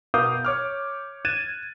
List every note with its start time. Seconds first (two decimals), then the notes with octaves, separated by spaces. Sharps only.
0.14 B2 A#4 F5 D6 D#6 G6
0.45 C#5 D6 F6
1.25 F#6 G#6 A6 D#7 E7